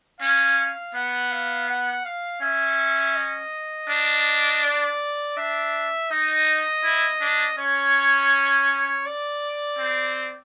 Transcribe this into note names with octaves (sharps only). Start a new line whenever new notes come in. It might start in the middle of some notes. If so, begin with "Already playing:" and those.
C#4 F5
B3 F#5
F5
F#5
F5
C#4 E5
D#5
D4
D5
D4 E5
D#4 D#5
E4
D4
C#4 C#5
D5
C4